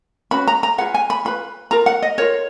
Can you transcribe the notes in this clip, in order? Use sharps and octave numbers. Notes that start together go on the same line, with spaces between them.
C#4 F#4 B4 B5
A#5
A#5
F4 G#4 B4 F#5
G#5
B5
F4 B4 B5
F4 A#4 A#5
F#5
D#5
F4 A#4 C#5